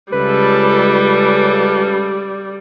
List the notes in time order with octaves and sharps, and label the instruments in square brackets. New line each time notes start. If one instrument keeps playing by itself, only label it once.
[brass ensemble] C#2 C#3 A4 [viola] G3 [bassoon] B4